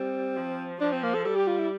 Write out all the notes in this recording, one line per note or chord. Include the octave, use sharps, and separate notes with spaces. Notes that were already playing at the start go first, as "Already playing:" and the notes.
Already playing: G3 C4
F3
F3 D4
C4
A#3
A4
G3 A4
G4
F4
E4